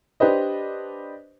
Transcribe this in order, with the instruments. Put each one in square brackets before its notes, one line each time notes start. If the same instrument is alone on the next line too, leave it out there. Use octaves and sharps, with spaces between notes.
[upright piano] D4 G4 B4 C5 D#5